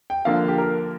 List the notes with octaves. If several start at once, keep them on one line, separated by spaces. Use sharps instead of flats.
G5
D3 F3 A#3 D4 F5
G4
A#4